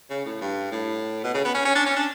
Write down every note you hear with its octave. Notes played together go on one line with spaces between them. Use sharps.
C#3
A2
G2
A2
B2
C#3
B3
C#4
C#4
D4
C#4
D4